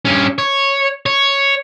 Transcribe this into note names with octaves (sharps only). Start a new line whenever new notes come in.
G2 C#4
C#5
C#5